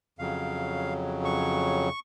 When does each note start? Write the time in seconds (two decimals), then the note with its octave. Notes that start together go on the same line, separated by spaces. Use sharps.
0.19 F2 C#3 F#3 F5
1.25 C#6